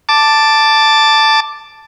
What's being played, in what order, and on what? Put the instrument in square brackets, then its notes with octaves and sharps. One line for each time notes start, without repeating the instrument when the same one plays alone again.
[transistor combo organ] A5 D6